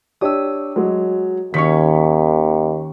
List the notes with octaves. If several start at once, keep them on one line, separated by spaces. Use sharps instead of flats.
D4 G4 C#5 D#6 E6
F#3 G#3 G#4
D#2 D#3 C#4 C#6 B6